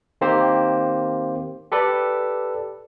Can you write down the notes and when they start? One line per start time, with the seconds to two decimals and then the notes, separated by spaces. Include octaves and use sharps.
0.21 D#3 A#3 C4 G4 C5
1.72 G4 A4 B4 D5